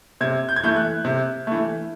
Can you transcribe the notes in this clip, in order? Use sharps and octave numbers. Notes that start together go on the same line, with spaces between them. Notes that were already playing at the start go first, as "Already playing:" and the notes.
C3 G#6
G6
G#6
E3 A3 G6
F#6
C3
E3 A3